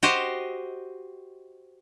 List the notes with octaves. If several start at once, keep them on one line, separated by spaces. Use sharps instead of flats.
F#4 G4 C5 D#5